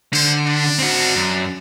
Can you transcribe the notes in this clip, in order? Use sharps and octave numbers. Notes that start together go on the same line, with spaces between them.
D3 C5
D4
C4 F#4
F#2